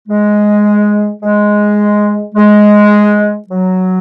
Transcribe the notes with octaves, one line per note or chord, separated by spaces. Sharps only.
G#3
G#3
G#3
F#3